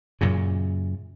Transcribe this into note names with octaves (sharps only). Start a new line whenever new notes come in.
F#2 A#2 C#3